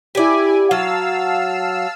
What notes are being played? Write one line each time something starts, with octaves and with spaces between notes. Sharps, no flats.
E4 G4 D5 G#5
F#3 F5 A5 E6